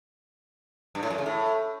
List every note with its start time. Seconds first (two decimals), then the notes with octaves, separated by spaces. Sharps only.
0.95 G2
1.03 A2
1.10 F#2
1.18 C#3
1.26 A2